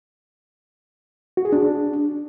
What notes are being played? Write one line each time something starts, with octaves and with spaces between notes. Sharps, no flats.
F#4
G#4
D4